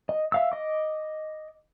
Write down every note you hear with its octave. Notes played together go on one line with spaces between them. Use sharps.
D#5
E5 F5 E6
D#5 D6